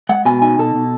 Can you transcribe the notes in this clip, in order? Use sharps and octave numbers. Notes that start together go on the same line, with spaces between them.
G#3 F#5
B2 G#5
D#4 G#5
B2 A4
B2